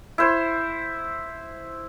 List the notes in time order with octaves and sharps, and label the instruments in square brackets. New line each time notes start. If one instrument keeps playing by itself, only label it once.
[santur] E4 C5